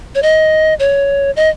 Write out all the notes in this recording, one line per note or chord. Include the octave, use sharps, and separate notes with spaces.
C#5
D#5
C#5
D#5